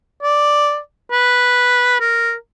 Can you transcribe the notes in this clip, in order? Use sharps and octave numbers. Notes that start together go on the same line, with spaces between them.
D5
B4
A#4